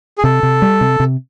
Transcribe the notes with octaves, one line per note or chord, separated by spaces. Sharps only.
G#4
C3 A4
C3
G3
C3
C3